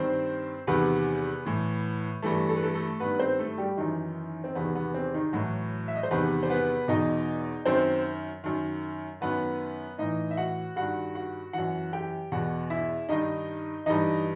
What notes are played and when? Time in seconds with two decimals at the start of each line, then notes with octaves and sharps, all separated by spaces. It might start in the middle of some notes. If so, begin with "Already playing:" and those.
Already playing: G2 D#3 C4 C5
0.67 E2 C3 D#3 B3 B4
1.45 A2 E3
2.22 G2 E3 A3 A4
2.49 A4
2.56 B4
2.63 A3 A4
2.74 A3 A4
3.00 G2 D#3 B3 B4
3.19 C4 C5
3.39 A3 A4
3.58 G3 G4
3.77 F#2 D#3 E3 D#4
4.44 C4
4.55 E2 C3 D#3 B3
4.75 B3
4.94 C4
5.14 D#3 D#4
5.33 A2 E3 F#3 F#4
5.88 E5
5.95 D#5
6.03 C5
6.11 E2 C3 D#3 B3 B4
6.43 C5
6.50 B3 B4
6.88 E2 B2 D#4 D#5
7.66 F#2 D#3 C4 C5
8.44 F#2 D#3
9.21 F#2 D#3 B3 B4
9.98 A2 E3 D#4 D#5
10.31 E5
10.37 F#4 F#5
10.76 G2 D#3 F#4 F#5
11.15 F#4 F#5
11.53 F#2 E3 F#4 F#5
11.93 G4 G5
12.32 E2 B2 F#4 F#5
12.70 E4 E5
13.09 G2 D#3 D#4 D#5
13.86 G2 E3 D#4 D#5